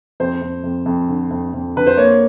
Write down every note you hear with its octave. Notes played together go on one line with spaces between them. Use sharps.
F2 C5
F2
F2
F2
D3
F2
F2
D3 B4
C5
A#3 C#5